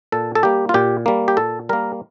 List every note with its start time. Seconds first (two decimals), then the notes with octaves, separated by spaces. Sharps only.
0.12 A#2 A4
0.35 A4
0.43 G3 A#3 G4
0.69 F4
0.74 A#2 G4
1.06 G3 A#3
1.28 G4
1.37 A#2 A4
1.69 G3 A#3 A#4